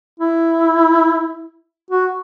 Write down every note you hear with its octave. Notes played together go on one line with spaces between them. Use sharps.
E4
F#4